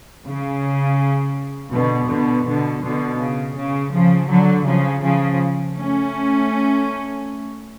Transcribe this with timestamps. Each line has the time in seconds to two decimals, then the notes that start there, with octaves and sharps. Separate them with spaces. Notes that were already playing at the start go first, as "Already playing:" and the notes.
0.25 C#3
1.72 B2 D3
2.08 B2 D3
2.46 B2 D3
2.83 B2 D3
3.19 C#3
3.56 C#3
3.92 C#3 F3
4.30 D3 F#3
4.66 C#3 F3
5.03 C#3 F3
5.76 A3 C#4